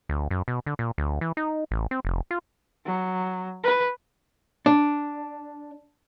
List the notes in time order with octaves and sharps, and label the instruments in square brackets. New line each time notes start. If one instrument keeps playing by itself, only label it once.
[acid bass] D2
F#2
B2
D3
A#2
D2
E3
D#4
A1
C4
F1
F4
[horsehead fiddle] F#3
B4
[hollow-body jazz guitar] D4